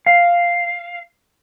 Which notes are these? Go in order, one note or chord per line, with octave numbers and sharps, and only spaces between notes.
F5